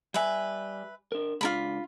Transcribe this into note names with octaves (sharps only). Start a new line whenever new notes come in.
G3 B4 E5 G#5
D4 A#4
C#2 D4 F4 A#4 B5